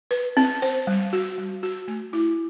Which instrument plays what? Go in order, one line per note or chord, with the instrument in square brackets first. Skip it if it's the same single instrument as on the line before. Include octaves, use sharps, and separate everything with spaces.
[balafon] B4
C4
C5
G3
F#4
G3
F#4
A3
E4